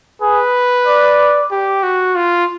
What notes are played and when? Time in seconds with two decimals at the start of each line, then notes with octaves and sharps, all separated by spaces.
0.21 G#4 B4
0.86 D5
1.51 G4
1.83 F#4
2.16 F4